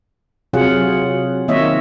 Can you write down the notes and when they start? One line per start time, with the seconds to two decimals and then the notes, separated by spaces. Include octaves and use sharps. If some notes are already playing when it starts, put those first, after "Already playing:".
0.53 C3 F#3 F4 G#4 F#5
1.48 D#3 A#3 C4 C#5 D#5 E5